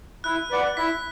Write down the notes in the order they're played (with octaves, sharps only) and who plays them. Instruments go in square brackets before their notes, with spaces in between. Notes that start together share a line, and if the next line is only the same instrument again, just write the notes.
[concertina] E4 [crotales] F#6
[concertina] B4 D5 F#5
[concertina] E4 [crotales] B6